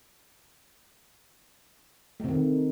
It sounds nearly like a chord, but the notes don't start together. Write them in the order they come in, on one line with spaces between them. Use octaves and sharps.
A3 C3 D#3